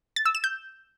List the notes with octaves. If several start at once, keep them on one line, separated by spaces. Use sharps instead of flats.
A6
E6
E7
G6